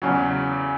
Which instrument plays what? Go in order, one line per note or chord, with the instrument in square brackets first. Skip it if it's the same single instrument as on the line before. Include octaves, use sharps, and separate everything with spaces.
[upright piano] E2 C#3 F#3